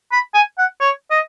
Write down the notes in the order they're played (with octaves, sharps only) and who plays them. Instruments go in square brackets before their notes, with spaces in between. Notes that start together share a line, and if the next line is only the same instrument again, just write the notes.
[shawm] B5
G#5
F#5
C#5
D#5